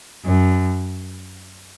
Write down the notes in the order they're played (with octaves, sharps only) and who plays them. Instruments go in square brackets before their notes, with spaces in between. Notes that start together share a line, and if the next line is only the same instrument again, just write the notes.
[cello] F#2